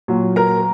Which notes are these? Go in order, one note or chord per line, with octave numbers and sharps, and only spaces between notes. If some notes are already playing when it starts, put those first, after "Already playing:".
A#2 F#3
A#4 A#5